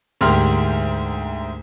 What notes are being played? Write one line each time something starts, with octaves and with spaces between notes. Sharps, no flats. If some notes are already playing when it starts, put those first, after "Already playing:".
D2 G#2 A#3 G4 F6